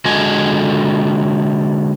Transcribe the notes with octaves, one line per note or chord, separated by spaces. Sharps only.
D3 G#3 F#4 A4 D#5 G#5